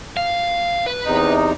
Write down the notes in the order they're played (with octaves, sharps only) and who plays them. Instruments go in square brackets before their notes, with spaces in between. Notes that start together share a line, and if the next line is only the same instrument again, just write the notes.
[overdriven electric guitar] F5
B4
[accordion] E2 C3 D#4